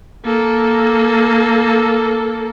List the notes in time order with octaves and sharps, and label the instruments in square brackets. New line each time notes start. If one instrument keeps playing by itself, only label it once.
[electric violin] A#3 A4